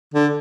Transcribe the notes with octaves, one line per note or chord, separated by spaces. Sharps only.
D3